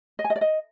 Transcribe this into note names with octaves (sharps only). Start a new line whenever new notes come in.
D#5
G#5
D#5
D5
D#5